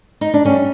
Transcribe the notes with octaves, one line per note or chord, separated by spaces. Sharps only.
D#4
D4
G3 C#4